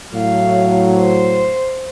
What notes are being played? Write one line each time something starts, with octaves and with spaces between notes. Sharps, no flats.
A2 F#3 F5
C5